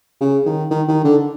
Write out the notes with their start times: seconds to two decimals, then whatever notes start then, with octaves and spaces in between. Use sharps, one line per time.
0.21 C#3
0.46 D#3
0.71 D#3
0.88 D#3
1.05 D3